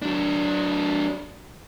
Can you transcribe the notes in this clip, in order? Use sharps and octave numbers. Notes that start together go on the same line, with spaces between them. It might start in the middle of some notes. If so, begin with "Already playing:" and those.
F#3 D4